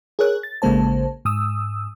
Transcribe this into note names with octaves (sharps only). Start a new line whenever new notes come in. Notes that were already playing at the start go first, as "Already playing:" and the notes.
G#4 A#4 C#5 F#6
A6
A1 C#3 G#3 A#3 C5 A5
G#2 D#6 E6